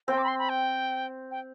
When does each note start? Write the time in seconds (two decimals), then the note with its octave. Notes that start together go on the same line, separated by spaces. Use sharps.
0.08 C4 G5
0.18 D6
0.24 B5
0.28 C6
0.39 B5
0.49 G5
1.31 G5